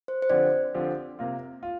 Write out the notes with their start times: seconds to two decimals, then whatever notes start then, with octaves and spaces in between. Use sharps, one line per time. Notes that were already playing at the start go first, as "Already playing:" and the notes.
0.08 C5
0.22 C5
0.30 D3 F3 C4 G4 D5
0.74 D3 F3 C4 G4
1.19 C3 A#3 F4
1.63 F4